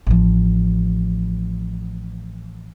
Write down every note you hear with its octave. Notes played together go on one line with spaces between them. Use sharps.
A1 F3